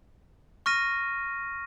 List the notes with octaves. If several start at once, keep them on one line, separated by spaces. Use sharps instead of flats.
C#6 F6 A#6 D#7